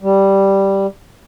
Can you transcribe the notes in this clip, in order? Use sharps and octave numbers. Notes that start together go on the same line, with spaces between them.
G3